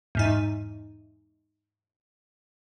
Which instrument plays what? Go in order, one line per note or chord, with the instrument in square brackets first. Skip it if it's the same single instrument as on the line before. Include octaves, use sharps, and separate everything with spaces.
[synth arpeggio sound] E2 G#2 D#4